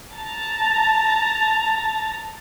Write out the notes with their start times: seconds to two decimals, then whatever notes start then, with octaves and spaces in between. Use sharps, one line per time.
0.14 A5 A#5